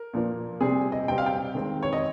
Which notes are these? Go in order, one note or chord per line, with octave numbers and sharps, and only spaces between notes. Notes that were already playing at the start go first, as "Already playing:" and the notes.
Already playing: A#4
A#2 F3 A#3
C3 G3 C4 G#4
D#5
C3 G3 C4 G5
F5
G5
D#3 G#3 C4
C#5
D#5